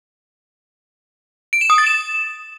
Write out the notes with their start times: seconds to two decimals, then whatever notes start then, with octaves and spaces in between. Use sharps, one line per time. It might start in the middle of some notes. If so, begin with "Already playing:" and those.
1.53 D7
1.61 E7
1.70 D#6
1.78 A6
1.87 E7